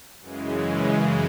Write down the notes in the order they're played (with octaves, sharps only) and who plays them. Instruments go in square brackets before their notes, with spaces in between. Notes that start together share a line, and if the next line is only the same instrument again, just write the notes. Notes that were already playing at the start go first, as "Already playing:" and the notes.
[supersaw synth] F#2 C#3 E3 G#3